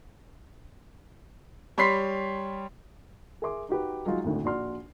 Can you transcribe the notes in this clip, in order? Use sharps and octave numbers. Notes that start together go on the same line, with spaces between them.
G3 C#5 B5 C6 B6 C7
G#4 A#4 E5 C6 D6
D#4 F#4 G4 B4
F#3 G#3 D#4 F4
G#1 D2 A2 D3
A#1 F#4 D5 C6 F6